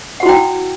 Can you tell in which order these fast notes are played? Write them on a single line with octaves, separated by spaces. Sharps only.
F#5 F#4 E4 G5